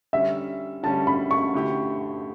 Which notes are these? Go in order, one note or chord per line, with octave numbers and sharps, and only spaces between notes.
D3 G3 C#4 E5
D3 G3 C#4 A5
B5
C#6
D3 A3 E4 G4